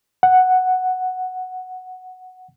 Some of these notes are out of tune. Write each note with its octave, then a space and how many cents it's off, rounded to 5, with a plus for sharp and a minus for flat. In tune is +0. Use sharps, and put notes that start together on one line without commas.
F#5 +0